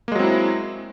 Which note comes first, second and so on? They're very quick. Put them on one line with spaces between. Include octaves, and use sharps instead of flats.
A#3 G#3 F#3 C4 E4